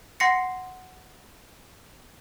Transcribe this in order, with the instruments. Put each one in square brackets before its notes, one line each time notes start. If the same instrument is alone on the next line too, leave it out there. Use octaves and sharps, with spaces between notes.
[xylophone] F#5 C6 A#6 C7 C#7